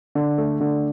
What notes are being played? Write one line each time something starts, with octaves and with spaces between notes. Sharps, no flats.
D3
A3
D3